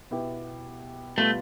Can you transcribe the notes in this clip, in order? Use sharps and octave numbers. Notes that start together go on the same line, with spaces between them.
B2 B3 E4 G4
B2 G3 A3 B3 F4